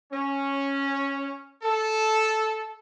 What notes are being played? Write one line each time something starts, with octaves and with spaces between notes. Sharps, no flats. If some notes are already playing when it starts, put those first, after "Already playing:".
C#4
A4